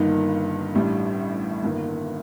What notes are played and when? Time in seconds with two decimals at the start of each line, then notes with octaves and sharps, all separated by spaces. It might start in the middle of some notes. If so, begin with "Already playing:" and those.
Already playing: G1 G2 D#3 A#3 D#4
0.74 A1 A2 G3 D4
1.62 G1 G2 D#3 A#3